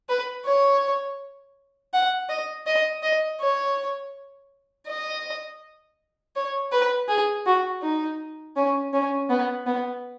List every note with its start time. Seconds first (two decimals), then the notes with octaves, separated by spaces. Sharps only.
0.09 B4
0.45 C#5
1.93 F#5
2.29 D#5
2.66 D#5
3.03 D#5
3.41 C#5
4.88 D#5
6.36 C#5
6.72 B4
7.08 G#4
7.46 F#4
7.83 D#4
8.56 C#4
8.93 C#4
9.30 B3
9.67 B3